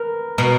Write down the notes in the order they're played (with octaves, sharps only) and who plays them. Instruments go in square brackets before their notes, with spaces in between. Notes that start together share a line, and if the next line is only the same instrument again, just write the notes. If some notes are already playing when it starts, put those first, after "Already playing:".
Already playing: [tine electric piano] A#4 B4
[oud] B2 [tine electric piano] A#4